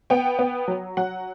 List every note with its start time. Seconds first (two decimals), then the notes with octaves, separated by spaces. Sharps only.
0.10 B3 G5
0.39 B3
0.68 F#3
0.97 F#3 F#5